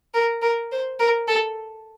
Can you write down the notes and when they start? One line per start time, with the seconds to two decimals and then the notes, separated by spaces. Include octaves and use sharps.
0.14 A#4
0.42 A#4
0.72 C5
0.99 A#4
1.28 A4